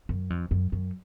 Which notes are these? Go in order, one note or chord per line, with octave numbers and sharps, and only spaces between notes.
F#2
F2
F#2
F#2